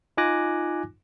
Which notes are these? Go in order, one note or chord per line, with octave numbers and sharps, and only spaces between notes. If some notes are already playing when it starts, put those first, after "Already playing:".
D#4 F4 G#5 D6 F#6 A#6